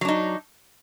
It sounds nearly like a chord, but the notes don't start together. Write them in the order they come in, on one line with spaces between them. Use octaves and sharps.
F#3 D4 D#4